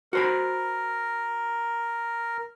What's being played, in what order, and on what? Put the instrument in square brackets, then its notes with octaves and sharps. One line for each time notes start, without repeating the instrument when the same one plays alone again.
[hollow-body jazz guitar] F#4 C5 B5 [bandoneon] A#4